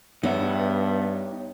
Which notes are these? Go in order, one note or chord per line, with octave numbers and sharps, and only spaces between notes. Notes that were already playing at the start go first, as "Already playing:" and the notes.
G2 B3 D#4 C#5 E5